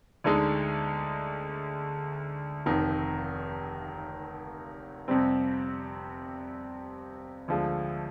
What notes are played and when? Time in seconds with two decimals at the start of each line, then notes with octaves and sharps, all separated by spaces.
0.24 D2 D3 G#3 D#4
2.66 F1 F2 D#3
5.08 F2 C3 G3 C4
7.48 D2 D3 F3 G#3